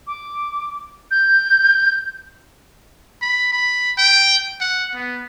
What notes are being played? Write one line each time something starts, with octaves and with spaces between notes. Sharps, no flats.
D6
G6
B5
B5
G5
F#5
B3